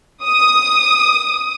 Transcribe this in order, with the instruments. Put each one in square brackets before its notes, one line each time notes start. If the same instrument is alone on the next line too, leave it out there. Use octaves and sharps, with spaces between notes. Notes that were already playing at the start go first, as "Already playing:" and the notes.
[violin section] D#6